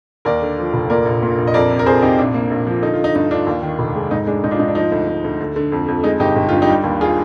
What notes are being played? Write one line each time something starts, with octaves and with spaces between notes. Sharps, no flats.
D#2 A#4 D5
D3
F3
F1
A#2 A#4 D5
A#1
A#2
A#1
D#5
F2 A#4 D5
C3
A#4
F2 G#4 C5
C3 D#4 G4
A#1 D4
A#3
A#1
F3
D3 D#4
F4
D3 D#4
G2 D#4
D3 D4 F4
D#2
D#3
F1
G#3
G#2 D#4
G#3 D4
G#2 D#4
D4 F4
G#2 D#4
D4
F3 D#4
D2
D2
D2
D3
D3
F2
F2
G#3 D#4
G1 D#4 G4
G1 G4
G2 F4
D#4 G4
G3
D#2
F4 G#4